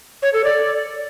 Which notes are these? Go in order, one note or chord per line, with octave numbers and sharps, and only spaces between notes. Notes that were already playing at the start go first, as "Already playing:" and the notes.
C#5
A4
D5